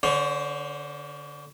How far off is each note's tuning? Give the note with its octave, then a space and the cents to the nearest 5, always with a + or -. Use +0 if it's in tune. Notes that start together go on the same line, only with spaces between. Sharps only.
D3 +0 C#4 +40 C5 +0